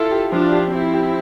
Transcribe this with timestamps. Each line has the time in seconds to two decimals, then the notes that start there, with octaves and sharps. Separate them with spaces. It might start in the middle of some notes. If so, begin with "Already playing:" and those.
Already playing: E4 F4 A4
0.11 G4
0.32 F3 D4 F4
0.52 G4
0.72 C4 E4 G4
0.94 G4